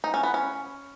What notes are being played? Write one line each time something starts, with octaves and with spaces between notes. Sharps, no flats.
D#4
C#4
B3
C#4